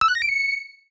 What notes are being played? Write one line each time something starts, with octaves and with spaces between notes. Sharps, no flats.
E6
F#6
A#6
D7
C#7